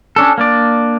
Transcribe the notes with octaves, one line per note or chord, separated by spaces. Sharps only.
C#4 D4 A4
A#3 D4 D5